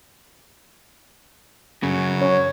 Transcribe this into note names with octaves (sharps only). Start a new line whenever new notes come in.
F#2 C#3
C#5